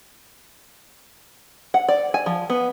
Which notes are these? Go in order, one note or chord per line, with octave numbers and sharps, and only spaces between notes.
F#5
D5
G#5
F3
B3